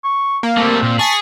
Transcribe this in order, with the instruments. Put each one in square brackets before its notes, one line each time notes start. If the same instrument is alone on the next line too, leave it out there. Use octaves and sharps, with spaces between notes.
[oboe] C#6
[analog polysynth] A#3
[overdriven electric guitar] G3 A3 [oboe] C4
[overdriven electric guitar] A#2
[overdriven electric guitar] G#4 [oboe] A5 [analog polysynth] C#6 A6 B6